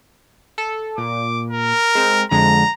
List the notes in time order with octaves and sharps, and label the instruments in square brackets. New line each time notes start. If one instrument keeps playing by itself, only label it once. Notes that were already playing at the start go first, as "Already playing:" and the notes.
[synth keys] A4
[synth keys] A#2 [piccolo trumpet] D6
[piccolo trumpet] A#4
[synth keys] G#3 C4
[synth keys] F2 D3 G#3 [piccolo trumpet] A#5